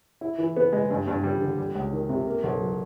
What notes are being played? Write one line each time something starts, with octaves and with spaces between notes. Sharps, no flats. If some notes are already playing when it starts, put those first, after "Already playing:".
E4
E3
B3
G#3
G2
G2
G3
D3
G3
C#2
D#3
C3
A#3
B1
F#3